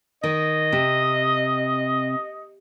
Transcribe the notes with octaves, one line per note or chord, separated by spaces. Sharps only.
D#3 D#5
C3